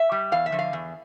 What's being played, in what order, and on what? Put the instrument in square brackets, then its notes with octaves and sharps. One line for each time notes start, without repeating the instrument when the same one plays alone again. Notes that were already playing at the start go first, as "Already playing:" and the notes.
Already playing: [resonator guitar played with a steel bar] E5
G3
E2 F5
E5
D3 F3
F5
E2